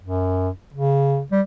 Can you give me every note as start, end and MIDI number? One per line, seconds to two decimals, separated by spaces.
0.03 0.49 42
0.74 1.22 49
1.32 1.41 55